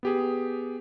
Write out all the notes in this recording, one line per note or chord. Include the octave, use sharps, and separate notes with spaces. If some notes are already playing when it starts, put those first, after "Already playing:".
B3 G4 G#4